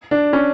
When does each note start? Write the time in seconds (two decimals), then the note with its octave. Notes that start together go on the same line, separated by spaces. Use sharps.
0.11 D4
0.33 C#4